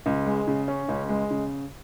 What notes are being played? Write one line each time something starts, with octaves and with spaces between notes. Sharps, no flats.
C#2
G#3
C#3
C#4
C#2
G#3
C#3